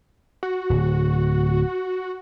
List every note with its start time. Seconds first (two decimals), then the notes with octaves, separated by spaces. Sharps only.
0.43 F#4
0.70 D1